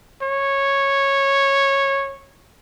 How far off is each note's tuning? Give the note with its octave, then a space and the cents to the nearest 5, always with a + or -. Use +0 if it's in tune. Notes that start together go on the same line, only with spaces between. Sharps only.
C#5 -10